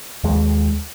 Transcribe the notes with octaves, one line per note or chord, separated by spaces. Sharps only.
D#2 G#3